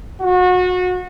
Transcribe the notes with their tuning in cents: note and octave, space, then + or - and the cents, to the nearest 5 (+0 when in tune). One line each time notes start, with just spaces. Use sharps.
F#4 -30